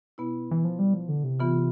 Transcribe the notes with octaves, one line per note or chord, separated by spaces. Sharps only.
B2 B3 E4
E3
F3
G3
F3
D3
C3
E3 B3 F4